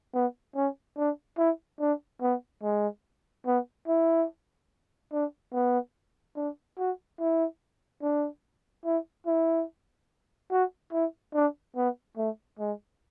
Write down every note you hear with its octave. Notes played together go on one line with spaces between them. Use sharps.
B3
C#4
D4
E4
D4
B3
G#3
B3
E4
D4
B3
D4
F#4
E4
D4
E4
E4
F#4
E4
D4
B3
A3
G#3